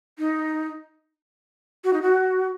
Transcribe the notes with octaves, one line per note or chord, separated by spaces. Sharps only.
D#4
F#4
D#4
F#4